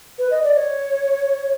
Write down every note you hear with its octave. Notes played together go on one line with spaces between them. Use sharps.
B4
D#5
D5
C#5